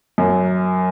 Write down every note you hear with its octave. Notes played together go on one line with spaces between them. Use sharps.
F#2